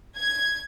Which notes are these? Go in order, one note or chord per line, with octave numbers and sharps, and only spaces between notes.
G#6